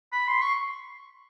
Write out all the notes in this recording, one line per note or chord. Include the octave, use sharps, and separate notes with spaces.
B5
C6
C#6